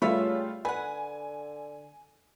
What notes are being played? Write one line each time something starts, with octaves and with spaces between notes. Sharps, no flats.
C#3 G3 A3 F4 B4 C#5 E5
D3 B4 F#5 G#5